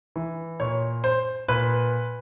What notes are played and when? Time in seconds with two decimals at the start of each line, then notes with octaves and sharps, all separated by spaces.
0.16 E3
0.60 A#2 C#5
1.04 C5
1.48 A#2 B4